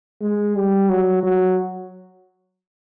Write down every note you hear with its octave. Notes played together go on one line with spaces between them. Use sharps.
G#3
G3
F#3
F#3